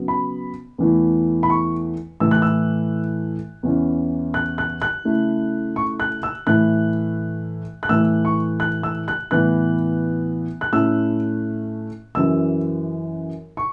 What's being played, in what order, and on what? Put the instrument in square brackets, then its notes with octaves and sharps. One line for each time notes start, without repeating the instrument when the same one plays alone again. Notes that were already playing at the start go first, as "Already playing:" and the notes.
Already playing: [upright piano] C#3 F#3 B3
B5
E2 E3 A3 E4
B5
C#6
A2 E3 A3 E4 E6
F#6
E6
E2 E3 C#4 E4
F#6
F#6
F#6
C#3 A3 E4
C#6
F#6
E6
A2 E3 A3 E4 F#6
F#6
A2 E3 A3 E6
C#6
F#6
E6
F#6
A2 E3 B3 F#6
F#6
A2 A3 C#4 E4 E6
F#2 E3 C#4 E6
C#6